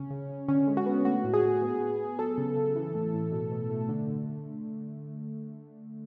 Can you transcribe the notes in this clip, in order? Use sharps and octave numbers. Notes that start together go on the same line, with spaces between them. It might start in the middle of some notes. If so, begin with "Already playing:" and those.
Already playing: C#3 C#4
C#3
C#3
D3 C#4
G#3
F#4
B3
A3 F#4
A2
G#4
A2
B3
B3
B3
F#3 A4
C#3
C#3
E3
A2
A2
B2
B2
A3
D3
D3